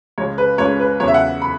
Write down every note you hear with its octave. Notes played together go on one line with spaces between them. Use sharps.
C#2 C#3 G#3 C#5
B4
C#2 C#3 G#3 C#5
B4
E2 C#3 F#3 C#5
E5
F#5
B5